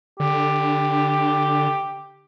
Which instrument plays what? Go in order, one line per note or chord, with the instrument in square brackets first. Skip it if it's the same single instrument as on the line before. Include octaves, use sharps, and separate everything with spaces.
[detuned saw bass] D3 [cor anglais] G4